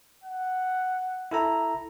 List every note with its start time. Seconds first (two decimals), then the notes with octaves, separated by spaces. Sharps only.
0.24 F#5
1.31 E4 A4 A#5